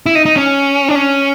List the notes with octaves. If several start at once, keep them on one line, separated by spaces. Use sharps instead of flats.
E4
D#4
D#4
C#4
D4
C#4